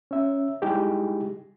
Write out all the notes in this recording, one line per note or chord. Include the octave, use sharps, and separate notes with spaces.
C#4 E5
G3 G#3 D#4 E4 G4 G#4